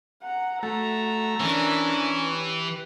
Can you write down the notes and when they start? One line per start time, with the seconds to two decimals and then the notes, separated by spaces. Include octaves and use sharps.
0.23 F#5 A#5
0.63 A3 F#4 E5 A#5
1.40 E3 C#4 D4 A#4
2.19 G4 B4